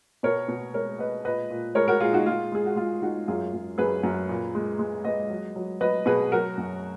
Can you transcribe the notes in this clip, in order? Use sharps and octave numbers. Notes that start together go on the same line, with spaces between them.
B2 A#4 C#5
B2
G#3 A#4 C#5
G#3 B4 D#5
A#2 B4 D#5
A#2
G#3 A#4 C#5
F#4 A#4
A#2 F4 G#4
D#4 F#4
G#3 F4
G#3 G#4
F#4
G#3 F4
G#3 D#4 F#4
F#2 F4 G#4
F#2
F#2 G#4 B4
F#2
A#2
G#3
G#3
G#3 B4 D#5
F#3
F#3
F#3 B4 D#5
B2 G#4 B4
F#3 F#4 A#4
F#2